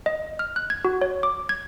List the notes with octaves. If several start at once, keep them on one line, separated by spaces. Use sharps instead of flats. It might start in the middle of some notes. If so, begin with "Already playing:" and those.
D#5
F6
F#6
G#6
F#4
C#5
D6
G#6